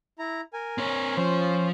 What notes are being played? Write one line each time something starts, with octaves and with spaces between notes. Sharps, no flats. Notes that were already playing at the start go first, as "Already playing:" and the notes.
E4 A#5
A#4 G#5
C4 C#5
F3 C#4 C5